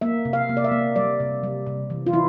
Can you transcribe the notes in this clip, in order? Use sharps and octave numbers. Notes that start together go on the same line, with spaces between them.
A#3 E5
C3
F5
A#3
D5
E5
A#3
G3 D5
C3
G3
C3
E3
F4
E3 E4